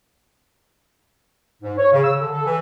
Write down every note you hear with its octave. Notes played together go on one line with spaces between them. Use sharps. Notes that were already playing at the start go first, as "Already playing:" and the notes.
G#2
C#5
C#3
E6
D3
A4
E3